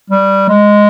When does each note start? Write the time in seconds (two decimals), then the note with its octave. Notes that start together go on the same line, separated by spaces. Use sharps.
0.10 G3
0.49 G#3